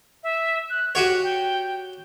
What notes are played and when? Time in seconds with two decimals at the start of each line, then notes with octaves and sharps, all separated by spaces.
0.23 E5
0.70 F#6
0.95 F#4 G4 C#5 F#5
1.23 G5